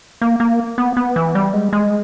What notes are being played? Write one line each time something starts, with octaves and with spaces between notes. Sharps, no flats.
A#3
A#3
B3
B3
E3
G3
G#3
G#3